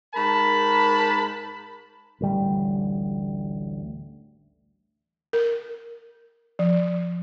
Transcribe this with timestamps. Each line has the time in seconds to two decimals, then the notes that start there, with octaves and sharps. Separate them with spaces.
0.15 G#2 A#4 A5 B5
2.21 A1 D2 G3
5.33 A#4
6.59 F3